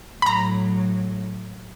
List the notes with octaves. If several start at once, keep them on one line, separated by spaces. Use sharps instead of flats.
A2 F#3 A#5 B5